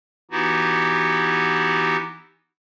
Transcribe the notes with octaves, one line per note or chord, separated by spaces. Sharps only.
E3 B3 D#4 E4 F#4 G4